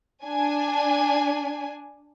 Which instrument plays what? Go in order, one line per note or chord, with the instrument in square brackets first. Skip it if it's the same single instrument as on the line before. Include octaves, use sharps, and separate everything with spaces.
[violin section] D4 G#5